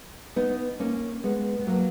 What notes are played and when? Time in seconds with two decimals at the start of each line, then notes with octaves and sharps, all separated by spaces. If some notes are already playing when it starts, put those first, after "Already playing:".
0.36 B3 D#4
0.80 A#3 C#4
1.24 G#3 B3
1.59 B3
1.67 F#3 A#3